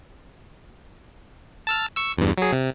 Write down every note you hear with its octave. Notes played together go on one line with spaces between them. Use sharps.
A5 E6 F6
C#6 E6
E2 G2
F#3 G#4
C3